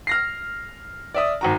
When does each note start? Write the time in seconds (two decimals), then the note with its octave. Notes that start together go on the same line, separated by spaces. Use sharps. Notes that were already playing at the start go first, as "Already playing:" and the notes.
0.07 F6 A#6 C7
1.14 D5 E5 D#6
1.41 G#1 F#4 A#5